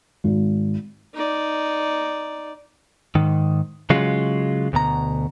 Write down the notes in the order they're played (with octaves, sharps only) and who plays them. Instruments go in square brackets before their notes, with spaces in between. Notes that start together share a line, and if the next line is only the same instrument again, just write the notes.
[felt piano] G#1
[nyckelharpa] D#4 D5
[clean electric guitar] G#2 D#3
C#3 F#3 G#3 F4
D2 B2 A#5